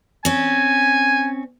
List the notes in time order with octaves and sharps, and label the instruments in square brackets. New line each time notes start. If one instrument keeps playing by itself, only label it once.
[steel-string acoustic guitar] C4 C#4 [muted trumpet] G#5